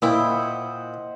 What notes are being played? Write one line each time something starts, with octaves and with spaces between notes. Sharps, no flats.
A#2 E4 C5 D#5 G5
F#5